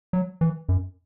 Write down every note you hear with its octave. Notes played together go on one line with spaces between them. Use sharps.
F#3
E3
F#2